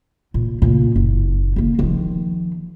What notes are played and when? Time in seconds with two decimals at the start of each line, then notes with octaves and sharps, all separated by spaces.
0.34 A#2
0.62 A#2 C#3
0.96 F#1
1.56 D#3 A#3
1.79 D#3 F3